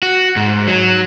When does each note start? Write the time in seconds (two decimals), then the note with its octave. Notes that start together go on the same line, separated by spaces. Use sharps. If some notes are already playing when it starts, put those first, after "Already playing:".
0.02 F#4
0.36 G#2
0.68 F#3